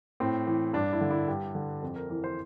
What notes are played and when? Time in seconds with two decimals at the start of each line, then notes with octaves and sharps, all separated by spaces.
0.20 A2 C4
0.47 E3
0.73 G2 D4
0.93 E4
1.01 D3
1.11 E4
1.28 G2 G4
1.55 D3
1.82 F2 A4
1.96 A#4
2.10 E3 A#4
2.24 C5